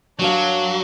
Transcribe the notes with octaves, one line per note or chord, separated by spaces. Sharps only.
F#2 F#3 D4 F#4 F5